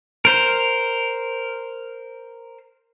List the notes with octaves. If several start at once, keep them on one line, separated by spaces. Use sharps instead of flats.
A#4 C5